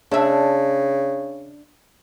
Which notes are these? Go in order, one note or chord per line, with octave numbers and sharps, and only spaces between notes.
C#3 D4 E5